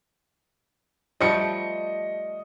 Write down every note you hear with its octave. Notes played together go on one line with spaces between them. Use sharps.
F3 G3 A3 D#5 C#7